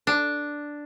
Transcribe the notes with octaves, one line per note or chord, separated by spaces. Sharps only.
D4